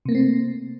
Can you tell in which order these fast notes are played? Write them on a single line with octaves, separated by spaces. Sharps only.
C3 A#3 A3 C4